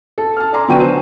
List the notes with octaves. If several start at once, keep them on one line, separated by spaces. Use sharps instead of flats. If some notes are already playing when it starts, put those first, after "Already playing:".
A4
A5 F6
D5 G#5 A#5 C6
D3 F#3 B3 G5 C#6 D#7
C5